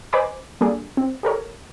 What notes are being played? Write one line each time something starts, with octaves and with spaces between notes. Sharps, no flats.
B4 C5 D#5 G#5 B5 D6
G3 A#3 D4 G#4 A4
C4
G4 A4 A#4 C#5